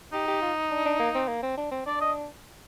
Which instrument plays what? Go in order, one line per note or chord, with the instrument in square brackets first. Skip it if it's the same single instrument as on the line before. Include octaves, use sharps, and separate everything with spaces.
[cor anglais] D#4 [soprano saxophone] G4
[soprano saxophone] G4
F4
D4
D4
A#3
C4
A#3
C4
D4
C4
[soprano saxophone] D4 [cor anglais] D5
[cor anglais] D#5